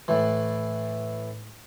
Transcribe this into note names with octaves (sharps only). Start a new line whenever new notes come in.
A2 E3